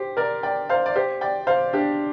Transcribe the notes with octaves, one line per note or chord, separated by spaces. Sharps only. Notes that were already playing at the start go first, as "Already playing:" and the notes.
Already playing: G4 C5
A#4 D5
D5 G5
C5 F5
D5
G4 C5
D5 G5
C5 F5
D4 G4